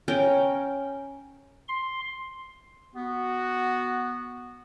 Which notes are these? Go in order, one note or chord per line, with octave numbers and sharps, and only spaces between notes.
C#4 A#4 G5
C6
B3 F#4